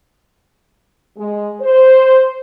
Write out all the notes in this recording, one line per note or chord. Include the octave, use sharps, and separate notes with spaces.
G#3
C5